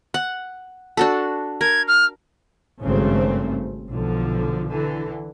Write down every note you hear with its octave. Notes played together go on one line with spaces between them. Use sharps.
F#5
D4 F#4 A4
A#4 G#6
F6
G#1 G2 C#3 A3 C4
B1 D3 F3
D3 E3